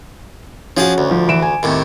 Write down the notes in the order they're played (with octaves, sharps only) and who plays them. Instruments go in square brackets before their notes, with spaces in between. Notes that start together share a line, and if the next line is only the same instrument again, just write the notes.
[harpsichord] F3 G#4 A5 [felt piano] C#4 F#4
[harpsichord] D2
[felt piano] F3
E3 D7 E7
G#5
[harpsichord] D#2 A2 C3